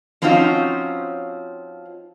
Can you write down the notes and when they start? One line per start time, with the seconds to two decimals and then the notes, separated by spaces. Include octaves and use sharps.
0.22 F3 C4 C#4 D#4 F4 F#4